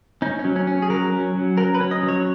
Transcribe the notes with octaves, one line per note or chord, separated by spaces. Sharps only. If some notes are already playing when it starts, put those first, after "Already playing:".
C#4 D#4
C#4
F#3
C#4
C#4
G#4
F#3 A#4
C#4
F#3
F#3 A#4
B4
C#4
D#5
F#3
C#5